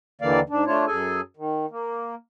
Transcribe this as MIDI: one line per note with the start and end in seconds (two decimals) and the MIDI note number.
0.21 0.40 39
0.21 0.40 50
0.21 0.40 52
0.21 0.40 58
0.21 0.40 74
0.21 0.40 77
0.50 0.64 44
0.50 0.64 62
0.67 0.85 57
0.67 0.85 62
0.67 0.85 65
0.67 0.85 73
0.87 1.21 42
0.87 1.21 68
0.87 1.21 69
0.87 1.21 80
1.37 1.66 51
1.71 2.15 58